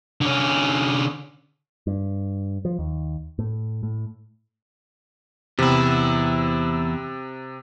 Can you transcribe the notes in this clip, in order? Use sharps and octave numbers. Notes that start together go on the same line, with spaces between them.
D3 C#4
G2
F3
D#2
A2
A2
E2 C3 E4